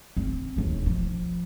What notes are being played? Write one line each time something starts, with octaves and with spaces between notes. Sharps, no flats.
C4
E1 D#2
F3